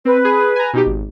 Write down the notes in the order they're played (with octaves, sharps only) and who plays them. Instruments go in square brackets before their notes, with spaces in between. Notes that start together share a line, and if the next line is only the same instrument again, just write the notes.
[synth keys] C4 [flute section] B4
[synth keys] G#4
G#5 A#5
B2 D#4 G4
G#1